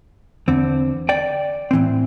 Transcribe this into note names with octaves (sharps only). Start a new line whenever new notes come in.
E2 D3 C4
D5 G5
A2 E3 C4